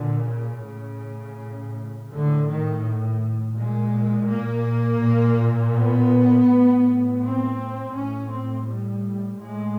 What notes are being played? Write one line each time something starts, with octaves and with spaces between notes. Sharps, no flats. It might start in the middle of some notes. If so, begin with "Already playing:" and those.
Already playing: A#2 D3
C#3
A2
A2 D3
D#3
A#2 G#3
A#3
A#2
B3
A2
C4
A2 C#4
C4
G3
A2 G#3